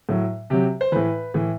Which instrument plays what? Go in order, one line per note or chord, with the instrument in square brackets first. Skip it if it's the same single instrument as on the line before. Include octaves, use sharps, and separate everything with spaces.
[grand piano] A2 F#3
C3 F#3 G4
C5
A2 E3 B4
A2 E3